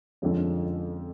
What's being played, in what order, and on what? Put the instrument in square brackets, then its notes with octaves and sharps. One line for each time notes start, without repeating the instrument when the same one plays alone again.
[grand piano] F2 D3 F3 G#3 C#4